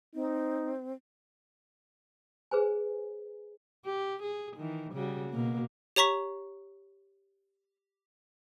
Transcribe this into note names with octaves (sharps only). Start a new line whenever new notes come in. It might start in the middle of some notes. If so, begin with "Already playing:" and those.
C4 D#4
G#4 B4 C5 G#5
G4
G#4
D#3 E3
C#3 G3 F#4
B2 A#3
G4 C#5 A#5 C#6 B6